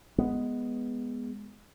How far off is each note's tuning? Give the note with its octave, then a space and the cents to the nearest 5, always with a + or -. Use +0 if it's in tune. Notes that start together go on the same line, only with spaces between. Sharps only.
G#3 +0 B3 +0